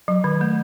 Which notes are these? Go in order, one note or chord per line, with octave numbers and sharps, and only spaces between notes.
F#3
D#3
A3